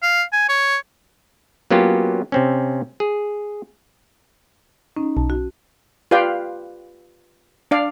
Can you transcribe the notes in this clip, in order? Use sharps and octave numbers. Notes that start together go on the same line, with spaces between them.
F5
G#5
C#5
F#3 A#3 B3 C#4 F4 G4
C3 C4 C#4
G#4
C#4 D#4
B1 A5
F#4
F4 G4 B4 D5 F5 G5
D4 D5 F5